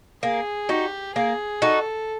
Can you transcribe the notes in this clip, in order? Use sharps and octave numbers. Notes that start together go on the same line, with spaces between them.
A#3 G#4
D#4 F#4 G4
A#3 G#4
D#4 F#4 A4